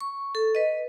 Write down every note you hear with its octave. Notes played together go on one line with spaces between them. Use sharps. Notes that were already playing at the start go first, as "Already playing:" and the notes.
C#6
A4
B4 D#5